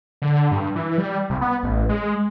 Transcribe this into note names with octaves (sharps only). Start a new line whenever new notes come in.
D3
G2
E3
G3
C2
B3
A1
G#3